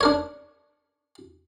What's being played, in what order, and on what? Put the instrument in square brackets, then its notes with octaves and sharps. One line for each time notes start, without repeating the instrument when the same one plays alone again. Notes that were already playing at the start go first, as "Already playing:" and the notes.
[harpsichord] D4 A#4 C#5